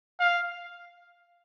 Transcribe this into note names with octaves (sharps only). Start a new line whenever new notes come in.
F5